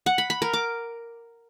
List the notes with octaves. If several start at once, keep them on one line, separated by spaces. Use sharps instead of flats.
F#5
B5
B5
A#4
D6